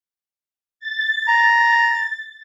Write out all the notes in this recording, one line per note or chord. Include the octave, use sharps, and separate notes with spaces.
A6
A#5